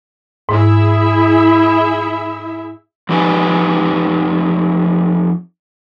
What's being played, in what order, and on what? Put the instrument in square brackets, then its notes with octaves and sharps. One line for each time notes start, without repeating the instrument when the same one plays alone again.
[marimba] G#2 [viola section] E4 G#4 E5
[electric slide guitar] F2 F3 D#4 G4 B4 G#5